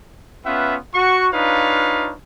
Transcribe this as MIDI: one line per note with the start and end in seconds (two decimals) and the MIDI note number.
0.46 0.77 59
0.46 0.77 61
0.46 0.77 65
0.46 0.77 71
0.46 0.77 76
0.46 0.77 78
0.95 1.28 66
0.95 1.28 85
1.34 2.13 62
1.34 2.13 63
1.34 2.13 65
1.34 2.13 71
1.34 2.13 73
1.34 2.13 77